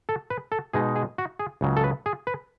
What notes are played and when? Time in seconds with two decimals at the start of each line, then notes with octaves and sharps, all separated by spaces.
0.09 A4
0.30 B4
0.52 A4
0.73 B2 G#3 D#4 G#4
0.96 G#4
1.18 F#4
1.39 G#4
1.61 C#2 C#3 F#3
1.76 A4
1.84 B4
2.06 G#4
2.27 B4